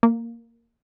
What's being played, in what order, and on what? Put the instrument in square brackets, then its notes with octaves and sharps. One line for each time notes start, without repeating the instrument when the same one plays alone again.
[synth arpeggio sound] A#3